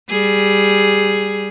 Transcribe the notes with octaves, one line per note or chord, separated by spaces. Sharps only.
G3 G#4